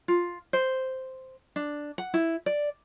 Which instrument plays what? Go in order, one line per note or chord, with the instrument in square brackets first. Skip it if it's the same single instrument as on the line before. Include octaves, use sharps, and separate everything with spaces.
[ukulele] F4
C5
D4
F#5
E4
D5